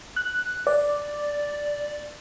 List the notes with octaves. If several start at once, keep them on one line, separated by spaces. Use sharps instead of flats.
F#6
D5